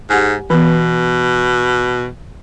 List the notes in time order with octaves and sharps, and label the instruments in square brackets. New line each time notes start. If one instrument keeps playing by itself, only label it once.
[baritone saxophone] G#2 [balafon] G4 F#5 G#5
[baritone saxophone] B2 [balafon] E3 B3